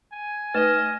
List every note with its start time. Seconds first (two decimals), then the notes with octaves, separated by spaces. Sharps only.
0.12 G#5
0.54 A3 D#4 B4 D#5 F6 E7